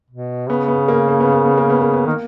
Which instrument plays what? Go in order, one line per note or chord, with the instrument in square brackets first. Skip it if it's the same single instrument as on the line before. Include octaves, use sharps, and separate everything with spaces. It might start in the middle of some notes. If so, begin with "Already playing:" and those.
[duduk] B2
[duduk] C#3 [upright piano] B3
[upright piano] B3
A#3
A#3
B3
A#3
B3
A#3
B3
A#3
B3
[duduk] D#3 [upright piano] A#3